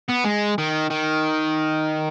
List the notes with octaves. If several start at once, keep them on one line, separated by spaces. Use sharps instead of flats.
B3
G#3
D#3
D#3